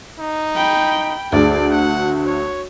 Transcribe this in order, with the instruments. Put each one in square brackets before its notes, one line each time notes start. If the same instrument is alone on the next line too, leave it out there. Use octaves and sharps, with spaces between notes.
[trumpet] D#4
[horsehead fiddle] G5 B5
[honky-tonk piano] D2 [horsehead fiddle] G#4 D5
[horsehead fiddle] F#4 [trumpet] F#5
[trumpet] C#5